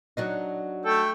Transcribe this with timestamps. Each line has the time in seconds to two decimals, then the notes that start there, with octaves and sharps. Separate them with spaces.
0.17 F#3 D4 D#4
0.85 A3 A4 G5